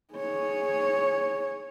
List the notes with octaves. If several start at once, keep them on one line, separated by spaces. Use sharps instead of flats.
G#4 C#5